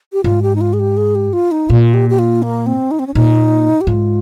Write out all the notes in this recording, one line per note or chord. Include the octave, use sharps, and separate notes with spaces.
G4
G#2 F4
G4
D#4
F4
G#4
G4
G#4
G4
F4
D#4
A#2 F4
G4
G4
F4
A#3
C4
D#4
C4
C#4
A#2 D#4
G4
G#2 F4